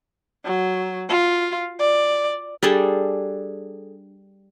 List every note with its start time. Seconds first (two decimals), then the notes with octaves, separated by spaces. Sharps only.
0.45 F#3
1.09 F4
1.79 D5
2.63 G3 D4 G#4 A4